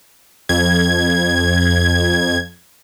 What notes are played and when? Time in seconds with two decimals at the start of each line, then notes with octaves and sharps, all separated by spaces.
0.49 F2 G#6